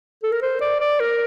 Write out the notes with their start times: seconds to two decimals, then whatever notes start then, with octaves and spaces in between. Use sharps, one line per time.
0.23 A4
0.32 A#4
0.42 C5
0.61 D5
0.80 D5
1.00 A#4